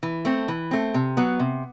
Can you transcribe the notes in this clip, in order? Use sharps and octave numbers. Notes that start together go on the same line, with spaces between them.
E3
A3 C4
E3
A3 C4
C3
F#3 B3
C3